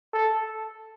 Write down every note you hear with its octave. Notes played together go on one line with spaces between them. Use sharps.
A4